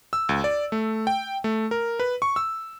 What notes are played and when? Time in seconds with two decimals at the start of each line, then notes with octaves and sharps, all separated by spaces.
0.13 E6
0.29 C#2
0.44 D5
0.72 A3
1.07 G5
1.44 A3
1.71 A#4
2.00 B4
2.22 C#6
2.36 E6